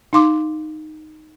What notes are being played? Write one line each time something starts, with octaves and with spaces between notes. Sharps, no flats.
D#4 F5 C6 D6